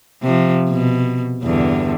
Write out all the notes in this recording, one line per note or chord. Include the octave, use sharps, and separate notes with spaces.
C3 F3
B2
E2 G2 D3